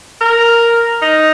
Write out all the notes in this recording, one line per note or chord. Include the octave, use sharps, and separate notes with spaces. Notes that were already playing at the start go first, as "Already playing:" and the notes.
A#4
D#4